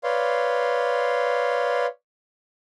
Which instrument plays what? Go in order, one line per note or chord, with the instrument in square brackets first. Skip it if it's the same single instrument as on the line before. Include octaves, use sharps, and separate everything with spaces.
[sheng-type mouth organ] B4 C#5 D5 F5 C6